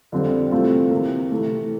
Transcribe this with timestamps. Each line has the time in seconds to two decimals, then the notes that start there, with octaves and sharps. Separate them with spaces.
0.12 F2 D3 G3 C4 F4
0.52 C3 E3 A3 C4 F4
0.91 C3 E3 A#3
1.31 C3 E3 A3